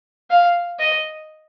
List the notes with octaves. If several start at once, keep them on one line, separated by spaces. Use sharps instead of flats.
F5
D#5